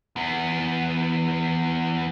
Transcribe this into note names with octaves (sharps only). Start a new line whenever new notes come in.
E2 B3